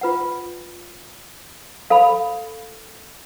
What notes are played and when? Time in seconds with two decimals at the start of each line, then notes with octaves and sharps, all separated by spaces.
0.01 F4 B4 F#5
1.90 A4 F5 B5